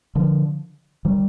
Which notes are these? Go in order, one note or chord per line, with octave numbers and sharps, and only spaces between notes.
D3 F3
D#3 G3